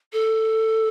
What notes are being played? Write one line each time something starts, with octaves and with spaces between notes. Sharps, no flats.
A4